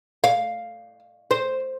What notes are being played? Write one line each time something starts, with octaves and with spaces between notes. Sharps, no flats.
F5
C5